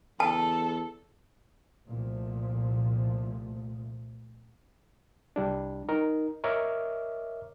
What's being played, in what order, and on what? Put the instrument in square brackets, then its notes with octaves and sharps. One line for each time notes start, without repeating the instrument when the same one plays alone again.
[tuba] E2 [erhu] A4 [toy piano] A5
[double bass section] C2 A#2 F3 A3
[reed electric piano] C2 G3 D4
D#4 A#4
A#4 C#5 D#5 E5 D6 F6